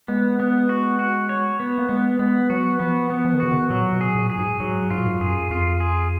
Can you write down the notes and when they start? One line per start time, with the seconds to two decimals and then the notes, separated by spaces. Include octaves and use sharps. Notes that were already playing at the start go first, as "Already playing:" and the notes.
0.08 G#3 B3
0.40 B3
0.69 F#4
0.99 F#4
1.29 C#5
1.60 B3
1.78 A#3
1.89 G#3 B3
2.19 G#3 B3
2.50 F#3 F#4
2.79 F3 B3
3.10 B3
3.25 F3
3.33 D#3
3.40 C#3 F#4
3.51 D#3
3.70 A#2 F#3
3.93 B2
4.01 G#4
4.15 A#2
4.30 G#4
4.38 G#2
4.60 G#2 F#3
4.90 G#2 F4
4.98 A#2
5.06 G#2
5.21 F#2 G#4
5.51 F2 F4
5.80 G#4